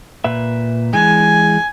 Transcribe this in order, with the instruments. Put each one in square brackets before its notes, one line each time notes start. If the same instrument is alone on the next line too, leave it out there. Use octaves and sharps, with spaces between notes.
[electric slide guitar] A#2 B4 E5
[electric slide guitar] E3 G#3 [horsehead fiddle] G#5